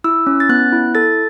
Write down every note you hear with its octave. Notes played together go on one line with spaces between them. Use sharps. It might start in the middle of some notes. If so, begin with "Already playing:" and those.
E4 E6
C#4
A6
B3 F#6
E4
A4 A6